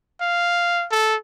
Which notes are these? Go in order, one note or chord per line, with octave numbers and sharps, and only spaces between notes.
F5
A4